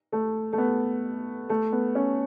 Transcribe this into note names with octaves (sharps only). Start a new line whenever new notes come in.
A3
A3
B3
A3
B3
C#4